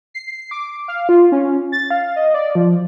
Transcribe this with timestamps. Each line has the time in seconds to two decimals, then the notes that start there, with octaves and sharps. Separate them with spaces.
0.14 C7
0.51 D6
0.88 F5
1.09 F4
1.32 C#4
1.72 A6
1.91 F5
2.16 D#5
2.34 D5
2.55 F3